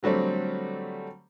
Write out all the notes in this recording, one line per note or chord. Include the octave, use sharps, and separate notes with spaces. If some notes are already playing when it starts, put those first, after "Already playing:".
D3 F#3 G3 A3 C4